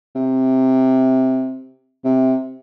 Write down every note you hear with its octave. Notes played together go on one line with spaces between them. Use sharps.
C3
C3